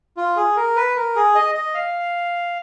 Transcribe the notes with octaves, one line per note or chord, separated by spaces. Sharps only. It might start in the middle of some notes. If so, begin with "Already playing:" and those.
F4
G#4
A#4
B4
A#4
G#4
D#5
D#5
F5